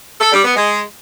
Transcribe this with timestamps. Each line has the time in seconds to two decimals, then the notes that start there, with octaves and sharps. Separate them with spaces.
0.20 A4
0.32 G3
0.44 B3
0.56 G#3